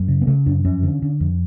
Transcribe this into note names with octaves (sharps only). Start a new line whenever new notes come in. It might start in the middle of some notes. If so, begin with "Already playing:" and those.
Already playing: F#2
C#3
B3
C#3 A3
F#2 D4
F2 C#4
D3
D3
F2